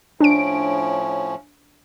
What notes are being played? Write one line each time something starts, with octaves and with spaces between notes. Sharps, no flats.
A2 F3 C#4 D4 D7